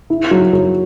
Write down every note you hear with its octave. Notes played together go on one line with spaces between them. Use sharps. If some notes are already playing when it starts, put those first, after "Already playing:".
E4
F#3
F#3